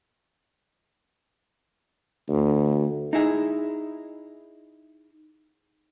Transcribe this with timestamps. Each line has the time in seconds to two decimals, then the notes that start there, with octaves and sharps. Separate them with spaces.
2.29 D2
3.13 D#4 E4 G#4